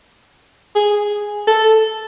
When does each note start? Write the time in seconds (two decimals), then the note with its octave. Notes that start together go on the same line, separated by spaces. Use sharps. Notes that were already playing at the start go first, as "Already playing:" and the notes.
0.75 G#4
1.47 A4